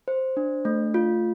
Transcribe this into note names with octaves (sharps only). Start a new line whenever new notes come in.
C5
D4
A3
F4